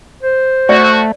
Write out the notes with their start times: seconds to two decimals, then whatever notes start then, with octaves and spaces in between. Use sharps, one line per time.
0.23 C5
0.69 A3 F#4 D5